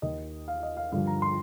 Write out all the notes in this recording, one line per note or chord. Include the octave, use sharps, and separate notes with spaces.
D#2 D#3 D#5
F5
D#5
F5
G2 D3 F3 F5
A#5
C6